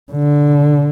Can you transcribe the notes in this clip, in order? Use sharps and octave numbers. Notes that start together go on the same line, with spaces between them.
D3